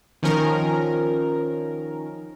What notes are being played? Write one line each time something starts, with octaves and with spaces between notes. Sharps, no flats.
D#3 F3 C#4 A#4